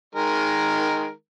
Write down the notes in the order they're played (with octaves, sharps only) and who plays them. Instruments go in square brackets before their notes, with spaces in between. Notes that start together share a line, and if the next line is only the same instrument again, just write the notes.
[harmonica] D#3 G#3 A#4